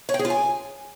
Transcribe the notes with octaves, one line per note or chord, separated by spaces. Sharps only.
C#5
G5
G#4
F4
G#5